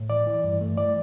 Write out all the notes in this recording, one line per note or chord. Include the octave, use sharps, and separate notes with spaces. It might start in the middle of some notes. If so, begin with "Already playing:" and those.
Already playing: A2
E3 D5
E3
G2
A3
E3 D5